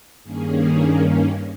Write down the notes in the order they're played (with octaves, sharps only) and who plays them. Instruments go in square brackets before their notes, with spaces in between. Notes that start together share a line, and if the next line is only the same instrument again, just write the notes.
[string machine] G2 D#3 A#3 C#4 G#4